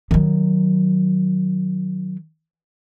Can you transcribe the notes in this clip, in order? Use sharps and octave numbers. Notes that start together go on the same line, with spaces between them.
D#3 F#3